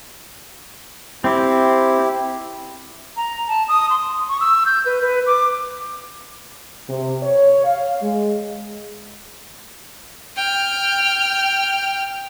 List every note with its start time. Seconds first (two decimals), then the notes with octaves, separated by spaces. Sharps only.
1.24 C4 E4 G4
3.17 A#5
3.48 A5
3.68 D#6
3.90 C6
4.28 C#6
4.41 E6
4.66 G6
4.86 B4
5.02 B4
5.26 D6
6.88 C3
7.22 C#5
7.65 F5
8.02 G#3
10.37 G5 F6